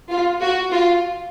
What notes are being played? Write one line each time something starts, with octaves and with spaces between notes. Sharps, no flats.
F4
F#4
F4